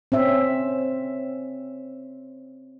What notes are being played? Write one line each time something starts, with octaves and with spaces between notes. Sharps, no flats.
C4 C#4 E5